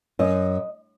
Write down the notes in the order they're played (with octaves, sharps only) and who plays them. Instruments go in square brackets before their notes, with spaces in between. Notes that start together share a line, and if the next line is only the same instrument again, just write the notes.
[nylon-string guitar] F#2 D#5